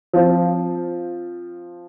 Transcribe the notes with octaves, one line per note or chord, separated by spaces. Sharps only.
F3 C4 F4